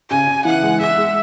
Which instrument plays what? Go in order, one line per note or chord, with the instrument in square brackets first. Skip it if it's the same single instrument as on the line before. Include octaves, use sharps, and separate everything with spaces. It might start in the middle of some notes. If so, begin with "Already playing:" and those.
[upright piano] C#3 [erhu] G#5
[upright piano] C#3
[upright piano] E3 [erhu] F#5
[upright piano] G#3
[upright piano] G#3 [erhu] E5
[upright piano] G#3